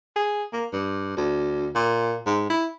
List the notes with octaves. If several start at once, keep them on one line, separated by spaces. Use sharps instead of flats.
G#4
A#3
G2
D2
A#2
G#2
E4